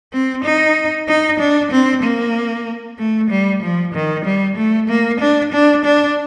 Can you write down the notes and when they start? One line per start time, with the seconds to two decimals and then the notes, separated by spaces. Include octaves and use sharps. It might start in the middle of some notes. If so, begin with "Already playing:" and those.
0.13 C4
0.44 D#4
1.08 D#4
1.40 D4
1.71 C4
2.03 A#3
2.99 A3
3.30 G3
3.63 F3
3.95 D#3
4.25 G3
4.57 A3
4.89 A#3
5.20 D4
5.53 D4
5.85 D4